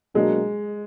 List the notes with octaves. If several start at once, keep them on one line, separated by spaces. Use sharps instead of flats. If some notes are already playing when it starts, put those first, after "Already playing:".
B2 F#3 G#3 A#3 D4